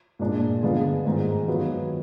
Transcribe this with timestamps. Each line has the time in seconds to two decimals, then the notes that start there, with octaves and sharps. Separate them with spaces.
0.19 A#2 G#3 D4
0.63 D3 G#3 B3 D4 F4
1.05 G#2 D#3 G#3 D#4
1.48 D#3 F#3 B3 F4